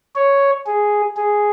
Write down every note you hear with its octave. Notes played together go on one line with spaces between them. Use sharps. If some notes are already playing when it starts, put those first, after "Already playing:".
C#5
G#4
G#4